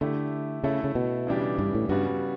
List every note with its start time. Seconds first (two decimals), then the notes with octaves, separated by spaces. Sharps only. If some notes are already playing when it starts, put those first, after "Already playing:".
0.01 D3 A3 E4 G4
0.64 C#3 A3 E4 A4
0.84 C#3
0.95 B2
1.27 C#3 E3 G3 D4 G4
1.59 G2
1.74 A2
1.89 G2 C#3 G3 B3 F#4